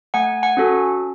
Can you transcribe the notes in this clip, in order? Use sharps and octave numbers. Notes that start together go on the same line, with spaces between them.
A3 F#5 G#5
F#5 G#5
C#4 F#4 A4